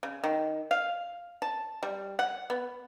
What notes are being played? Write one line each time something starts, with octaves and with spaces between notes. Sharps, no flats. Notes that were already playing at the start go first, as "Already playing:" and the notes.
C#3
D#3
F5
A5
G3
F#5
B3